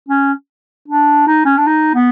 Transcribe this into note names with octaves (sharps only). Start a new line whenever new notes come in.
C#4
D4
D#4
C#4
D4
D#4
B3